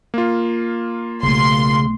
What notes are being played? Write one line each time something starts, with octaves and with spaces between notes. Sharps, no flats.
A#3 F4
B1 C#3 A3 C6